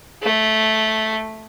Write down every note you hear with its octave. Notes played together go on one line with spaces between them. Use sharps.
A3